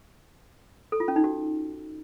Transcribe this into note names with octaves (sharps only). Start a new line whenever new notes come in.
A4
F4
C#4
D#4
F#4